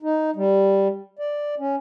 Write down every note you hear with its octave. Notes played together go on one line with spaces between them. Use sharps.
D#4
G3
D5
C#4